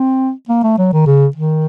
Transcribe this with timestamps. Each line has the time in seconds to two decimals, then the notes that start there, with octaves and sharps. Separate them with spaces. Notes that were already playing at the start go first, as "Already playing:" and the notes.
Already playing: C4
0.49 A#3
0.63 A3
0.78 F#3
0.93 D#3
1.07 C#3
1.36 D#3